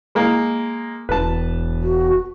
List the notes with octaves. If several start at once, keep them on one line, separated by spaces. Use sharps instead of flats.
G#3 A#3
E1 B4 A5
F#4